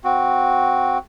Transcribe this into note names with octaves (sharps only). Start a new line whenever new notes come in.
C4 F#4